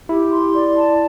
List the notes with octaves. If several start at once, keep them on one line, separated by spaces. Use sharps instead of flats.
E4 G4
C6
D5
A5